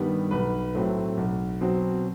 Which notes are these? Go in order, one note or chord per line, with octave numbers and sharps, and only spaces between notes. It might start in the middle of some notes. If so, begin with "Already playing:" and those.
Already playing: G2 D#3 G3 B3
B1 B4
A2 F#3 A3 C4
B1
B2 F#3 C4